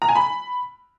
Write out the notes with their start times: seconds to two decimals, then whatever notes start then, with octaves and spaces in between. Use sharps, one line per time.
0.02 A#5
0.09 G#5
0.15 B5